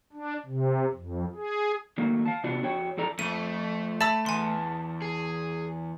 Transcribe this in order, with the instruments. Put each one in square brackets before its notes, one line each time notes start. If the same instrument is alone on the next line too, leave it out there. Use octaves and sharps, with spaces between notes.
[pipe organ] D4
C3
F2
G#4
[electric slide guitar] D#3 F#3 A3 A#3
F5 A5
C3 B3 D4 F4 F#4
F2 F#4 C#5 G5
F#2 F3 A4 D5 A#5
[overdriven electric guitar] F2 [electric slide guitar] A3 [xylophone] D#7
[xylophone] E5 B5 E6 [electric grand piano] A5 A6 E7
[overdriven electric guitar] E2 [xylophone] G#5 C6
[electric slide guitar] G#4